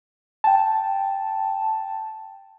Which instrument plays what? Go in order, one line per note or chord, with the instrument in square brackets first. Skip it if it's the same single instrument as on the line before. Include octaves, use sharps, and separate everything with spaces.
[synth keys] G5 A5